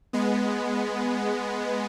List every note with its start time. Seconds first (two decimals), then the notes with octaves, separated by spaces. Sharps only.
0.13 G#3 B3